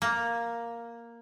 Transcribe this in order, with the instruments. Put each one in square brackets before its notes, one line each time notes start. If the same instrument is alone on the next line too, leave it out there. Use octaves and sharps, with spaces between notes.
[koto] A#3